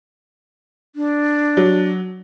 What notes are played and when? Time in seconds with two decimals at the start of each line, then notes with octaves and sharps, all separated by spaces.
0.96 D4
1.57 F#3